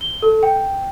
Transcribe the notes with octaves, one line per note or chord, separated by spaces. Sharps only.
G7
A4
G5